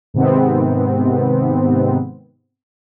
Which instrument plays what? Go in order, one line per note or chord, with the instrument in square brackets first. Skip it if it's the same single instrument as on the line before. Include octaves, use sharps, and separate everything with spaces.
[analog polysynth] G#2 C3 D#3 B3 C4